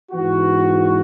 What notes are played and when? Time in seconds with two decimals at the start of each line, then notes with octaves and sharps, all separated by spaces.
0.11 G#2 E3 B3 F#4